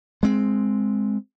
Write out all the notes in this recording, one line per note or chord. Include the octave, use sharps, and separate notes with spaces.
G#3 C4